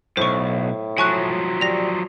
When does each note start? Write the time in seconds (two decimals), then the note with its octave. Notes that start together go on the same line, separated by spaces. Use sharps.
0.17 B1 F#2 A2 C5 C#6
0.98 F3 F#3 G#5 C#6 F#6
1.61 G3 A#6 F7